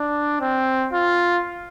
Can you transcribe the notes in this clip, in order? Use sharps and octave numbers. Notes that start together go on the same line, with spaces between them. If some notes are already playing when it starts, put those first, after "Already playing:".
Already playing: D4
C4
F4